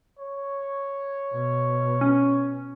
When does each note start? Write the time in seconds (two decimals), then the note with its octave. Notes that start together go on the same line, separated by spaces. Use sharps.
0.19 C#5
1.33 B2
2.01 C#4